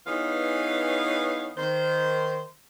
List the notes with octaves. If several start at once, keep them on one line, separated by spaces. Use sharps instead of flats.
E3 B3 D#4 G#4 C#5 F5
D#3 C5